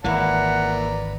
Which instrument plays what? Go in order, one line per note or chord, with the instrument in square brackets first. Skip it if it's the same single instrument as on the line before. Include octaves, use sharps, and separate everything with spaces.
[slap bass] G#1 E3 [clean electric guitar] A#3 E4 [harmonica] B4 D5 A#5 [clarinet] F#5